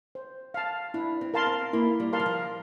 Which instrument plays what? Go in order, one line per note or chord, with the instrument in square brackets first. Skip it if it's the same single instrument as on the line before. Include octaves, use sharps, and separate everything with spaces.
[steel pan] C5
F5 A5
[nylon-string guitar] D4 [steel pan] E4
[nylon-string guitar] C4
[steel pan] A#4 F5 A5 C6
[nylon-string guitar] C4
[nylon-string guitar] A#3 [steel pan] E4
[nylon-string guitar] G3
[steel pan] A#4 F5 A5 C6
[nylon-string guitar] E3
F3